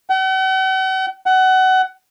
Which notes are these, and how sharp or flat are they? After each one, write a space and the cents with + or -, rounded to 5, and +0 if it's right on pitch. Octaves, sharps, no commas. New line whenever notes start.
F#5 +45
F#5 +25